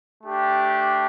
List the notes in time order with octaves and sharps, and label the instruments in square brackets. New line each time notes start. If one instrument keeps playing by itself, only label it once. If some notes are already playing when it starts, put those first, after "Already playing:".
[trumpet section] A3 D4 G4